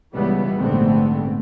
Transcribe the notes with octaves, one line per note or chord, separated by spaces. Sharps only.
C#2 E3 G3 B3
A#1 G#2 D3 A3 B3 C4